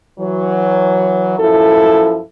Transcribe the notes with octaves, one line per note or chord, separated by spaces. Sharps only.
E3 F#3
F#2 F3 E4 A4